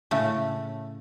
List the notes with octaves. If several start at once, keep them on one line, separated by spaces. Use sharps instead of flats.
A2 C#3 A3